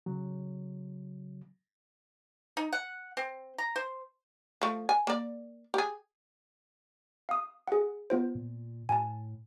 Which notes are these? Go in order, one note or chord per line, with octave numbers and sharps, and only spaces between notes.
C#3 F#3
D#4
F#5
C4
A#5
C5
F3 A3
G#5
A#3 D5
G4 G#4
F5 D#6
G#4 F#5
B3 F4 C5
A#2
A2 G#5 A5